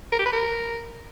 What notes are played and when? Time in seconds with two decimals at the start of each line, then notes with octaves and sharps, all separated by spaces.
0.12 A#4
0.19 G4
0.26 B4
0.32 A#4